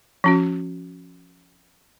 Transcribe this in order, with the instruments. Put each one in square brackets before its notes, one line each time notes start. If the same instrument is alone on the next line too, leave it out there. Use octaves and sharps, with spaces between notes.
[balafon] F3 C#4 F#4